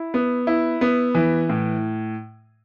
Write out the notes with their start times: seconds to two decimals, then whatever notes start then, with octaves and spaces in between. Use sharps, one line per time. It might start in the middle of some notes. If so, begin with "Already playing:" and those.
Already playing: E4
0.14 B3
0.47 E4
0.81 B3
1.15 E3
1.49 A2